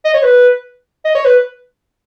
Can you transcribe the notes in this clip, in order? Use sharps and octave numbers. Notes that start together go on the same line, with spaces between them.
D#5
C#5
B4
D#5
C#5
B4